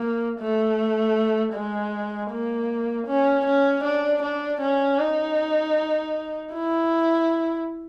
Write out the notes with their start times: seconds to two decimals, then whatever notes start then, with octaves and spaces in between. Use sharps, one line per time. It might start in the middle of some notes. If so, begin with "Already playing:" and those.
Already playing: A#3
0.39 A3
1.53 G#3
2.31 A#3
3.07 C#4
3.46 C#4
3.84 D4
4.22 D4
4.61 C#4
4.99 D#4
6.52 E4